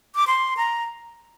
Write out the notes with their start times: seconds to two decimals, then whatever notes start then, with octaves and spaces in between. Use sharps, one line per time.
0.16 D6
0.27 C6
0.57 A#5